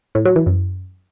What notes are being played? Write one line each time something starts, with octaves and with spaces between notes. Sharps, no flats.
A2
F#3
E3
F#2